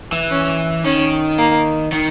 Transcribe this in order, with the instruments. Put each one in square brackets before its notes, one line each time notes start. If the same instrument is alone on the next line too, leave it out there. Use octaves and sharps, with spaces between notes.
[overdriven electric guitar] E3
[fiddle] C#4
[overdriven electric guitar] D#3 [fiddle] C#4
[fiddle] A#3
[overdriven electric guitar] D#3